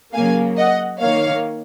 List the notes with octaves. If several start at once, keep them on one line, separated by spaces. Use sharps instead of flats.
C#3 F#3 A#3 F5 G#5
D#5 F#5
D#3 A#3 C#5 F5